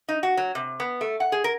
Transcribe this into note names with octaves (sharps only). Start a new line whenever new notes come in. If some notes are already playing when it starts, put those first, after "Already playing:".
D#4
F#4
F#3
C3
B3
A3
F#5
G#4
A#4